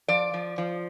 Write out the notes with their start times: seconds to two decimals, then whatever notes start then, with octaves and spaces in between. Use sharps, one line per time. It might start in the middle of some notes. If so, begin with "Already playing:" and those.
0.08 F3 D5
0.34 F3
0.58 F3